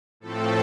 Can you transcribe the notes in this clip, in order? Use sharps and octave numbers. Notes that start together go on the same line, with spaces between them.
A2 F3 A3 C4 A4